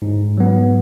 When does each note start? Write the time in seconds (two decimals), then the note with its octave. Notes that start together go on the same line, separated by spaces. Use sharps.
0.02 G#2
0.37 F#3 B3